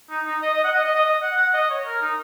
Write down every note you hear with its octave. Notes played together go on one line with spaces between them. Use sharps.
D#4
D#4
D#5
D#5
F#5
D#5
D#5
D#5
D#5
F#5
F#5
D#5
C#5
A#4
D#4